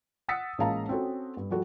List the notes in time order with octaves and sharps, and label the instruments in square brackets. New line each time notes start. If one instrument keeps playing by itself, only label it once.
[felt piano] F#5 D#6 E6 A6 B6 C#7
A1 G#3 A#3 F5 A5 A#5
C4 C#4 F#4 A4
G2
F3 G3 F#4 A4